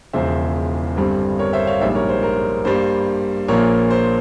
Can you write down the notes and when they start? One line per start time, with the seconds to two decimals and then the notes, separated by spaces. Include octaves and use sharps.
0.13 E1 E2 C#3 F3 C5 E5
0.97 G1 G2 G3 C4
1.39 A#4 C#5
1.53 C5 E5
1.67 C#5 F5
1.81 A#1 G#2 G3 C5 E5
1.95 A#4 C#5
2.09 C5
2.23 A#4
2.65 G2 G3 A#3 C5
3.48 A#1 A#2 F3 A#3 A#4 C#5
3.90 C5